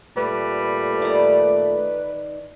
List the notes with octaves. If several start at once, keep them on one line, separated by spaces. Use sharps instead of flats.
A#2 G3 A3 B4
D#3 D5